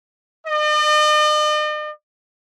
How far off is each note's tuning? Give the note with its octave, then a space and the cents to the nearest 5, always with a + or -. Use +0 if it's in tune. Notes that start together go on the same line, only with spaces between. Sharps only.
D#5 -45